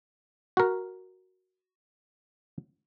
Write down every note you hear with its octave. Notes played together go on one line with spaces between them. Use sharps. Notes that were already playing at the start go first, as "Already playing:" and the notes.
F#4 A#4